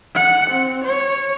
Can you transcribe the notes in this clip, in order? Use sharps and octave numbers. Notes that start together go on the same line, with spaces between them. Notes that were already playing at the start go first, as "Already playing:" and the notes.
F#5
C4
C#5